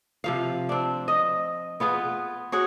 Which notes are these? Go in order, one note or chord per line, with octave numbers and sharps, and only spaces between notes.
C3 F3 F5
C4 D4
D#5
B3 F4 G#4 B4
F#4 G#4 C#5 F#5